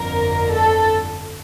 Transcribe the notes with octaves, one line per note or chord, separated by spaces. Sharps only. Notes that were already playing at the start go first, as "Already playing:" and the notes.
Already playing: G1 F2 D3 A#4
A4